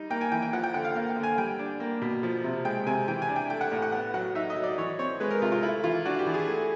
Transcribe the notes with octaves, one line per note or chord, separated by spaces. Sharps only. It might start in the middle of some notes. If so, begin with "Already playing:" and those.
Already playing: G3 D#4
A#3 G5
G#5
E3 G5
G5
F3 F#5
G5
D3 F#5
F5
A#3 F5
G5
D3
G#5
G3 G5
D4
A#3
B2
F3
C3
G#3 G5
C3 G#5
E3 G5
G#5
D4
G5
A3 G5
F#5
A2
F#5
B3 F#5
F#3 F#5
D#4 E5
D#5
F#3
D5
E3 C#5
C4 C#5
G#3 B4
A#4
C3 F4
F4
A3 E4
E3 F4
D4 F#4
G4
E3
G#4
A3